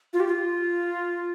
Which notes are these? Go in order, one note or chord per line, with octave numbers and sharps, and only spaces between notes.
F4
G4
F4